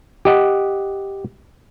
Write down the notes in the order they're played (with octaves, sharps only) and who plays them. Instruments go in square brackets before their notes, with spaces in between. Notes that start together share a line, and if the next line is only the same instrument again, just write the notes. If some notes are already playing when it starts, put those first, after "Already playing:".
[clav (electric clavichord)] G4 D#5 F#5